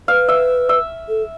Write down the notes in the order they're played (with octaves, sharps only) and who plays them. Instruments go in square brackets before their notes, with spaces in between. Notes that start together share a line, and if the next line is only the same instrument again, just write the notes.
[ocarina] B4 [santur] F5
[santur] E5
E5
[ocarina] A4